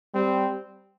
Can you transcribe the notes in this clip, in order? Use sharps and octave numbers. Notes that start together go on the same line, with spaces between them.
G3 C4